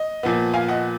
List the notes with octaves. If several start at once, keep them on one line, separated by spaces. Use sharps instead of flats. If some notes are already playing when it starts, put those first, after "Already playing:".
Already playing: D#5
A#2 F3 B3
F5 G#5
D#5 F#5